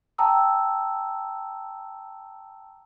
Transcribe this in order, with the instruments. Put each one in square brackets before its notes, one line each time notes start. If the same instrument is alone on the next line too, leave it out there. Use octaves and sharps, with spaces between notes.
[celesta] G5 A5 A#5 D#6 E6